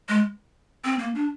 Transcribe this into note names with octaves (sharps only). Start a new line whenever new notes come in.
G#3
C4
A#3
D4